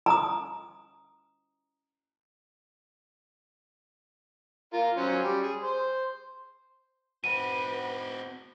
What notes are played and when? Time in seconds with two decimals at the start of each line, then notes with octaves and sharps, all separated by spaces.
0.06 A#5 D#6
4.73 F4 A#4
4.97 F#3 C#4 C5
5.23 G3
5.42 G#4
5.62 C5
7.24 C4 F#4 B4 D#7